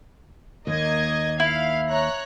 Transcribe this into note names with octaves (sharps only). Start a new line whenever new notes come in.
D#2 A#3 D#5 G#6
E4 F5
C#5 A#5 F#6